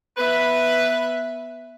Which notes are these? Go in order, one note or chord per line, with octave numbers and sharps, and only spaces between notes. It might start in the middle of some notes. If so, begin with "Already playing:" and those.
B3 B4 E5